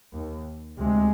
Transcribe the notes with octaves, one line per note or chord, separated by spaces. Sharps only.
D#2
D2 C3 G#3